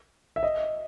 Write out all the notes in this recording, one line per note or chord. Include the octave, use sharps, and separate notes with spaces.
E5
D#5